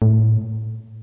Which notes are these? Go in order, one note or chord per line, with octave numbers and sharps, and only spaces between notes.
A2